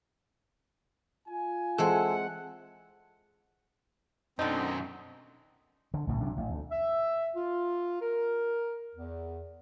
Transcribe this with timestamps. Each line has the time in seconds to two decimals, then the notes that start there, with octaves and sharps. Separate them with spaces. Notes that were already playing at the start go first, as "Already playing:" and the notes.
1.29 F4 G#5
1.78 E3 G#3 C4 A4 F#5
4.39 F#2 B2 D3 C4 D#4
5.94 D3
6.07 B1 A2 C#3
6.21 C3 F#3 D4
6.37 A1
6.50 D2
6.72 E5
7.36 F4
8.02 A#4
8.96 E2